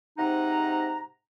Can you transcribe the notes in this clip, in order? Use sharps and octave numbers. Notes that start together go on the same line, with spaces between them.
G#2 C3 D#4 F#5 A#5